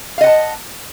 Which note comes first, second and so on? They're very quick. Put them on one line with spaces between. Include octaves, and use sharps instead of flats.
F5 D#5 F#5 A5